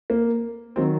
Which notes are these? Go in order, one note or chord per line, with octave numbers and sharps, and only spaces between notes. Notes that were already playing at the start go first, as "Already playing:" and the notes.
A#3
D#3 F#3 C4